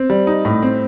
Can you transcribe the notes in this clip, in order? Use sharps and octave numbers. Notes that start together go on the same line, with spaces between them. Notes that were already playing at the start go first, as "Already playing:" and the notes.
Already playing: C4
G3
D#4
A2
C4